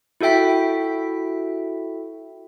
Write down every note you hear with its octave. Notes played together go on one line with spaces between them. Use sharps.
E4 F#4 A4 E5 G5 B6